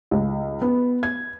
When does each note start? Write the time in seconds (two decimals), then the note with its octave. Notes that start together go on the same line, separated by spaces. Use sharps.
0.11 C#2
0.61 B3
1.03 G#6